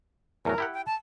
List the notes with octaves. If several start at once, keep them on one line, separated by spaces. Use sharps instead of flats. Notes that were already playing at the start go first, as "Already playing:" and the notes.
E2 A2 F#3 A#4
E4 G4 F#5
G5
A5